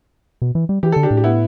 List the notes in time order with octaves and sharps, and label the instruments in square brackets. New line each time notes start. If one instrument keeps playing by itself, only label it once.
[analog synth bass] B2
E3
G3
[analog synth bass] E3 [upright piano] G4
[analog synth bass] D3 [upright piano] A4
[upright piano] D4 G4
[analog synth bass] A2
[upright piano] G4
B3 E4